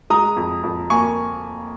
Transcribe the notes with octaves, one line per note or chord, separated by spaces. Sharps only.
G#3 A#5 D#6
F2
F2
A#3 G#5 C#6